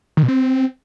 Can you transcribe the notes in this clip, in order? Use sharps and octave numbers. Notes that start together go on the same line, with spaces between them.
D#3
B2
C4